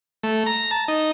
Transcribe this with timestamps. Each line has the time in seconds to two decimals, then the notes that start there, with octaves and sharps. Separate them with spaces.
0.23 A3
0.46 A#5
0.71 A5
0.88 D#4